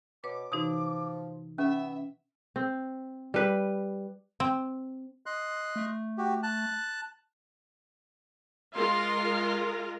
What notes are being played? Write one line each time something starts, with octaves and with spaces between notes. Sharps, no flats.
B2 B4 C#5 D6
C3 E3 F3 D#4 F#4 D#6
B3 C#4 E5 C#6
C4
G3 B4
C4
D#5 C6 F#6
A3
F#4 G4
A5 F#6
G#3 F4 A#4 C6